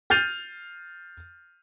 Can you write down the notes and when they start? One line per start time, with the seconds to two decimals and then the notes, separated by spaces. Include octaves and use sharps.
0.10 F6 G6 A6 C7 D#7 F7